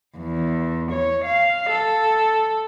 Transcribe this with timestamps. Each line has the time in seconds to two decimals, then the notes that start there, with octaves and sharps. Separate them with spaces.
0.17 E2
0.92 C#5
1.26 F5
1.71 A4